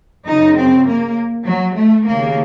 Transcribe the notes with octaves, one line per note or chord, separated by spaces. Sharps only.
F#2 C#3 D#4
C4
A#3
F#3
A3
D#2 C#3 A#3